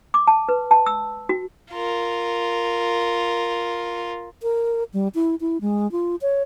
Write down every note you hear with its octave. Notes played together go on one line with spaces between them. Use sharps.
D6
A5
B4
A5
E6
F#4
F4 A#4
A#4
G3
E4
E4
G#3
F4
C#5